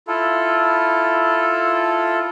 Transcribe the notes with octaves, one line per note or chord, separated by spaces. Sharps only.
E4 F4 A4